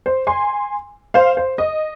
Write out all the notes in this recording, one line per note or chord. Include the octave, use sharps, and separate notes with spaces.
C5
G#5 C6
C5 F5
C5
D#5